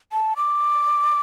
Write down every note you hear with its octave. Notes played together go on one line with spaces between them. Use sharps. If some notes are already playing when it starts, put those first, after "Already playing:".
A5
D6